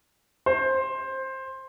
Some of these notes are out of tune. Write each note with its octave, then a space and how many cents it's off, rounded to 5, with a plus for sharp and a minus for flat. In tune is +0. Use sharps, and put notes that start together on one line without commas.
C5 +15